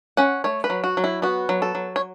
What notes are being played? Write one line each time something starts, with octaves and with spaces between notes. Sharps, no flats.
C#4 F#5
A3 C#5
B4
F#3
F#4
F#3
E4
B3 F#4
F#3
A4
F#3
C#5